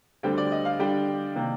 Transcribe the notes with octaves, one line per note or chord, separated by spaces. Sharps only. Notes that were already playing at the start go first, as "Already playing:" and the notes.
D2 D3 G3 C4 G5
D5
D#5
F5
D3 G3 D4 G4 G5
C3 D#3 A#3